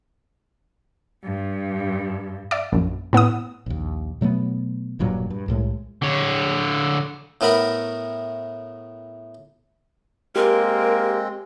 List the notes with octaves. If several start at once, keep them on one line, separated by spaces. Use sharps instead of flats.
G2
D5 E5
A#1 F#2
A2 B3 F#5 D#6
A#1 D#2
B2 F#3 A3 B3
E1 G2 A#2 F#3
G2
C2 A2 F3 G#3
D3 C#5
A2 A3 B3 A#4 B5
G#3 A#3 C4 G4 A#4